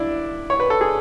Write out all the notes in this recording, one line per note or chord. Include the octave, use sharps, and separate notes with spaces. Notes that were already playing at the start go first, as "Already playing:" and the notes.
Already playing: D4 E4
C#5
B4
A4
G#4